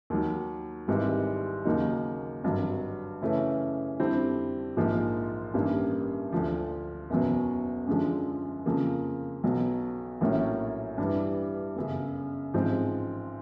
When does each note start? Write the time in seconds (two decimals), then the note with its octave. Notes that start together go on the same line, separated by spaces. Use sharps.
0.10 D#2 D#3 F#3
0.88 G#1 G#2 E3 G3
1.65 D#2 C#3 F#3 A#3 D#4
2.44 G#1 G2 D3 F#3
3.22 F#2 C#3 E3 A3 C#4
3.99 F2 D3 G3 C4 E4
4.77 A#1 G#2 F3 A#3
5.54 A1 G2 D#3 G3 A#3
6.33 D2 D3 F3
7.10 F#1 E2 B2 F#3
7.87 F#2 D3 F3 G#3
8.66 F2 C#3 F3 A#3
9.44 B1 B2 F#3
10.21 A#1 A2 F#3 A#3 C#4
10.98 G2 E3 G3
11.75 G1 F#2 C#3
12.54 A1 G#2 F3 G#3 C4